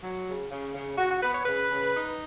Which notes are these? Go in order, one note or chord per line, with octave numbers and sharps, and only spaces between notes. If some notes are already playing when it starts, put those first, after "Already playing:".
F#3
C#3
C#3
C#3
C#3 F#4
F#4
B3 B4
C#5
C#3 B4
C#3
D#4